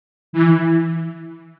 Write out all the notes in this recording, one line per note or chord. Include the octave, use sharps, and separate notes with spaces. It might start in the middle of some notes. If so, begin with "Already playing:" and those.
E3